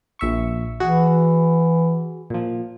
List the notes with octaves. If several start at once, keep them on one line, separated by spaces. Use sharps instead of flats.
A#1 E5 C#6
E3 F#4 G#4
A#2 F3